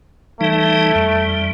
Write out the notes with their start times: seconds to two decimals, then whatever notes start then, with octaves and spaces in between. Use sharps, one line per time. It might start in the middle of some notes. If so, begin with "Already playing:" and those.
0.41 E3 G3 A3 D#4
0.95 F2 G3